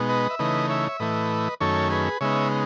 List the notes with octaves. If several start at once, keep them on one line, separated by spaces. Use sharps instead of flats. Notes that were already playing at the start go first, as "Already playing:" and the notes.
Already playing: B2 G#3 B3 D#4
B4 D#5
E5
C#3 E3 A3 D#4 B4 D#5
C#5 E5
E5
A2 E3 A3 B4 D#5
F#2 D#3 A3 C#4 A4 C#5
G#4 B4
C#3 G#3 B3 D#4 C#5 E5